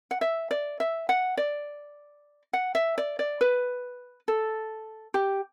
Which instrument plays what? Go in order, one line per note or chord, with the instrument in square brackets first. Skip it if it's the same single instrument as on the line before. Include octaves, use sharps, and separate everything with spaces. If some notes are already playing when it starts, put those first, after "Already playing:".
[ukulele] F#5
E5
D5
E5
F#5
D5
F#5
E5
D5
D5
B4
A4
G4